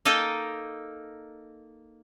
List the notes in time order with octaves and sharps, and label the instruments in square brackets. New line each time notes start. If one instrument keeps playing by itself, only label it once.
[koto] A#3 D#4 A4 D#5 G5